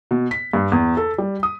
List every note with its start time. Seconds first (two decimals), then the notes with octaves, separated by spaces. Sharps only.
0.11 B2
0.31 B6
0.53 G2
0.72 E2
0.97 A4
1.18 G3
1.43 D#6